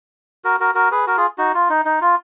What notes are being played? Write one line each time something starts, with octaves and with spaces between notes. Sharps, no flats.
F#4 A#4
F#4 A#4
F#4 A#4
G#4 B4
F#4 A#4
F4 G#4
D#4 F#4
F4
D#4
D#4
F4